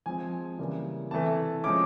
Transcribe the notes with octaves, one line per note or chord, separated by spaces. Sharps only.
F3 G#3 C4 G#5
C#3 E3 G3 A#3
C3 E3 A3 A5
F3 G#3 C#4 D6